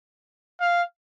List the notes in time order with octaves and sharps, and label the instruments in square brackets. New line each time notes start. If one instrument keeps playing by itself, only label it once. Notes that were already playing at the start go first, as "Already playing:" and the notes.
[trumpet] F5